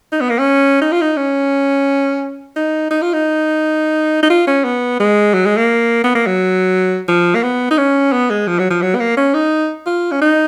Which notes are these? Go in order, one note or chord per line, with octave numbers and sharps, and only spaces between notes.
D#4
B3
A#3
C#4
D#4
F4
D#4
C#4
D#4
D#4
F4
D#4
D#4
F4
C#4
B3
G#3
F#3
G#3
A#3
B3
A#3
F#3
F3
A#3
B3
D#4
C#4
B3
G#3
F3
F#3
F3
F#3
B3
A#3
C#4
D#4
F4
C#4
D#4